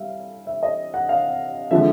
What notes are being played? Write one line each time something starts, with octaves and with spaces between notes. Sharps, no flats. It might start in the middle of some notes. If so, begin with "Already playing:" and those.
Already playing: G3 E5 F5
E5
D#5
F#5
F5
D3 F3 G#3 E5